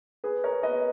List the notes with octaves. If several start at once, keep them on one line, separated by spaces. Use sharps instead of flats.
G#4 B4
A#4 C#5
B4 D#5